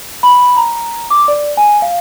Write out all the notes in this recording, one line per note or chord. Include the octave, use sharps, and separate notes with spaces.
B5
A#5
D6
D5
G#5
F5